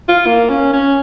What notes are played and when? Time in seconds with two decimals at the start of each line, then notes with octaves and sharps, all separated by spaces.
0.09 F4
0.26 A#3
0.50 C#4
0.73 C#4